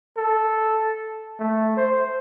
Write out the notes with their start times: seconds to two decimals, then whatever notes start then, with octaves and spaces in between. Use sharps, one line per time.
0.17 A4
1.39 A3
1.77 C5